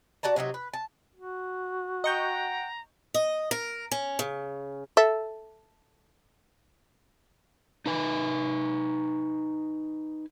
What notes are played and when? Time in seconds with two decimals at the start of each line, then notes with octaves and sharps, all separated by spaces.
0.23 F#4 D5 A5 A#5
0.36 C3 F#3 C#4 D#4
0.54 B4
0.73 A5
1.15 F#4
2.04 D#5 F#5 G5 A#5 C#6 G6
3.14 D#5
3.51 A#4
3.91 C#4
4.19 C#3
4.97 A4 E5
7.86 D#4 B4 G#5